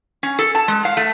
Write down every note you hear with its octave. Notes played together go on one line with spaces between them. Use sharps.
C#4
A4
A5
G#3
F5
A3